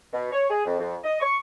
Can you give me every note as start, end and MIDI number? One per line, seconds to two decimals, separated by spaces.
0.13 0.27 47
0.31 0.44 73
0.49 0.64 68
0.65 0.78 41
0.79 0.95 41
1.04 1.18 75
1.20 1.37 85